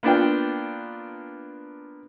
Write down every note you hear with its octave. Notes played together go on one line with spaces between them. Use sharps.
A#3 B3 D4 F4 G5